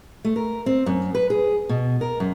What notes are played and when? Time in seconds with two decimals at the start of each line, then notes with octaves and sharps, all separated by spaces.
0.24 A3
0.36 A#4
0.66 C4
0.86 F#2
1.15 B4
1.30 G#4
1.69 B2
2.01 A#4
2.20 F#2